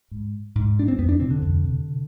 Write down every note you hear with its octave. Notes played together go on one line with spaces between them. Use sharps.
G#2
G#2
D4
C4
F2 B3
D4
C3 C4
D3
F2
C3